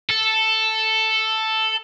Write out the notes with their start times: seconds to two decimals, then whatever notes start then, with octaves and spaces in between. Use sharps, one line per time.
0.09 A4